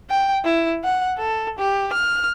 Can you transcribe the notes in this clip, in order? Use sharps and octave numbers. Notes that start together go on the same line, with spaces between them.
G5
E4
F#5
A4
G4
F6